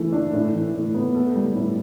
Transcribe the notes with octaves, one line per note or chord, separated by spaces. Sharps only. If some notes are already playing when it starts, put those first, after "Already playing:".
Already playing: E3 A3
D4
A2
E3
A2
B3
A4
G3
A2